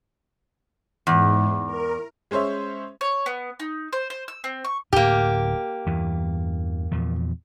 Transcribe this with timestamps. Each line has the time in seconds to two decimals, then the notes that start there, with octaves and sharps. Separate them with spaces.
1.07 E2 G#2
1.66 A#4
2.31 G#3 C#4 C5 C#5 E5
3.01 C#5
3.26 B3
3.60 D#4
3.93 C5
4.10 C5
4.28 E6
4.44 C4
4.65 C#6
4.93 D1 A2 A#3 G4
5.86 E2 G2 E3
6.92 E2 A#2 F3